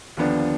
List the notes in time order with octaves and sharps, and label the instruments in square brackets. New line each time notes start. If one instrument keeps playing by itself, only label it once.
[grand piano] D#2 D3 F3 B3 D4